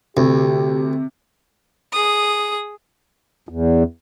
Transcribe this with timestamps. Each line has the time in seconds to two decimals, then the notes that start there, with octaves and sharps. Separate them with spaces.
0.17 D2 C3 G4
1.93 G#4 D#6
3.49 E2